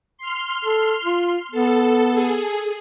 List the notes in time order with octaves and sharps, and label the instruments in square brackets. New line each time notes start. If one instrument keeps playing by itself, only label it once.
[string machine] C6 F6
[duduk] A4
F4
[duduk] B3 [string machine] A4
[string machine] G#4